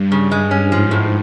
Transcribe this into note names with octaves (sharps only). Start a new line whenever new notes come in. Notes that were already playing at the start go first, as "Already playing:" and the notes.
Already playing: G2
C#3
G#3
C#4
G#2 F3
A2